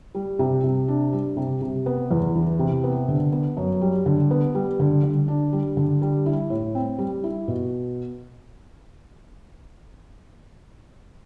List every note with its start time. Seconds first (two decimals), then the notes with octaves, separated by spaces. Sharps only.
0.15 G3
0.39 C3
0.64 C3
0.88 D4
1.13 G3
1.37 C3
1.62 C3
1.86 B3
2.11 E2
2.35 E3
2.59 C3
2.84 B3
3.08 D3
3.32 B3
3.57 F#2
3.81 G3
4.06 D3
4.31 B3
4.55 G3
4.80 D3
5.04 D3
5.28 D4
5.53 G3
5.77 D3
6.02 G3
6.26 E4
6.50 A2
6.75 C4
6.99 G3
7.24 E4
7.48 B2